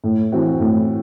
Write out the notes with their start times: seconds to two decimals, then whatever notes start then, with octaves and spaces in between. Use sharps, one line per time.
0.04 A2
0.32 E3 C4 F#4
0.60 A2